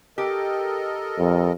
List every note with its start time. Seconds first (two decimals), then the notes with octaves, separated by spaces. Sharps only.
0.18 G4 A4 A#4 D#5
1.19 F2